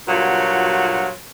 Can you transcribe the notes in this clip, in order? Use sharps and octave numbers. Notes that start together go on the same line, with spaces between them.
G2 A#2 F#3 F4 F#4